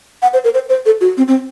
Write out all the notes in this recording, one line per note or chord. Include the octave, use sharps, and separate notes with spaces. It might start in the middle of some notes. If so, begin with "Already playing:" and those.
F#5
C5
A#4
C5
C5
A4
F#4
C4
C4